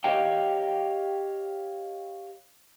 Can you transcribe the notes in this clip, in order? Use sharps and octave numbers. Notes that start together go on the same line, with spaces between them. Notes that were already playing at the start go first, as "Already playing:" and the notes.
G4 C#5 D#5 F5 G5